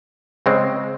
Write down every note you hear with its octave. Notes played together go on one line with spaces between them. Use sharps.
C#3 G#3 C4